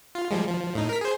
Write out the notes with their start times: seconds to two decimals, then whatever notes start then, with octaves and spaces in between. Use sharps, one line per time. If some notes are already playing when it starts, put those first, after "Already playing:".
0.15 F4
0.31 F3 G3 G#3
0.48 F3
0.75 A2 D#4
0.89 A#4 B6
1.01 G#4 C5